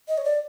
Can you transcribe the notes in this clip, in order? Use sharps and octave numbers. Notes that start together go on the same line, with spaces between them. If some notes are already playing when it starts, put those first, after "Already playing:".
D#5
C#5
D5